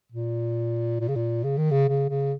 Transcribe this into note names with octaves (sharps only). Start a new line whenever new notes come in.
A#2
A#2
C#3
A#2
C#3
D#3
C#3
C#3
C#3